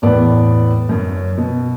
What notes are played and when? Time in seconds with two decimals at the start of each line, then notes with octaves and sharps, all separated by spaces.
0.02 E2 A2 B3 D5
0.89 F#2 C#4
1.38 B2